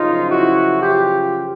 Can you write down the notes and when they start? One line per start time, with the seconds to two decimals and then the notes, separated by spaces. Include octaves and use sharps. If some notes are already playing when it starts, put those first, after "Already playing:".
Already playing: F#2 C#3 F3 D#4 F4
0.29 E4 F#4
0.82 F4 G4